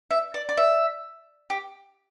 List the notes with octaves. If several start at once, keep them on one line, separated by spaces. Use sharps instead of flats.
E5
D5
D5
E5
G4